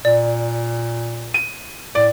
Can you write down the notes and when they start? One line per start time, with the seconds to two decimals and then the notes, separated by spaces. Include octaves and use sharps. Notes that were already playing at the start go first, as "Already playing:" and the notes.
0.05 A#2 D5
1.34 D#7
1.95 A2 D5